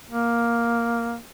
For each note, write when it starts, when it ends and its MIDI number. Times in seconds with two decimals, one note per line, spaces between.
0.11 1.17 58